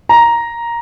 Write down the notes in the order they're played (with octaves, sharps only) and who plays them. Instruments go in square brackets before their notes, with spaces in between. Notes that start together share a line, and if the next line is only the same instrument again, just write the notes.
[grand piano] A#5